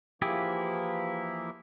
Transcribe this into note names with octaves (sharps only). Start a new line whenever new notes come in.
E3 F3 A#3 E4 G4 G#4